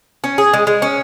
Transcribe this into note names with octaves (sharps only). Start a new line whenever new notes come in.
C#4
G#4
G#3
G#3
C#4